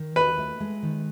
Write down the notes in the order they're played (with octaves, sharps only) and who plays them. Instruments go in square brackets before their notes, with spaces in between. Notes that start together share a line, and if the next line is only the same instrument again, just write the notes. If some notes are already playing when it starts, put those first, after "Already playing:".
Already playing: [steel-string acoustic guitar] D#3
[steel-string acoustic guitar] D#2 [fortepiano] B4
[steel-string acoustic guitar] A3
G#3
D#3